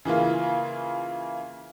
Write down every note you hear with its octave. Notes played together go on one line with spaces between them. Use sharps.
C#3 E3 A#3 F4